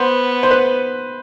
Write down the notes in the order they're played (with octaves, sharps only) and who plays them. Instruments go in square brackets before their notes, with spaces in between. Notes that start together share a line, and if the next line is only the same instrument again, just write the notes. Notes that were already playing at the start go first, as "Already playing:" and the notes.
Already playing: [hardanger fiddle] B3 [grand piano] C5
[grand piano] C5
B4